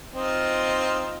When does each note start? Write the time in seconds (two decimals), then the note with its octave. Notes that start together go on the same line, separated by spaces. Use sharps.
0.13 C4 D#4 F4